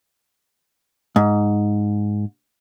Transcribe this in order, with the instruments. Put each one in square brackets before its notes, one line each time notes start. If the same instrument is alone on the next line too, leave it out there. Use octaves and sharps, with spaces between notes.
[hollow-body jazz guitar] G#2